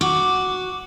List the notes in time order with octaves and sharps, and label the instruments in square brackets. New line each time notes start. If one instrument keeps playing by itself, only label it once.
[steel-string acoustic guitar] F#4 [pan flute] D6